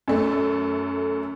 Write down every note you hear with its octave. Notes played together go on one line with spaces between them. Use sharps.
F#2 A3